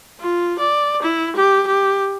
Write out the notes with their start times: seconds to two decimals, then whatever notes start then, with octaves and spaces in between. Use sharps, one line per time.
0.20 F4
0.59 D5
1.02 E4
1.36 G4
1.67 G4